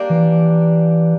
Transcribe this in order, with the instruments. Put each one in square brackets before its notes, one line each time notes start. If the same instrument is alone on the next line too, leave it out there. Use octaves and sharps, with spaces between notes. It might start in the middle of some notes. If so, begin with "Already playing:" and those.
Already playing: [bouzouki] G3 A#3 D4
[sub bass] E3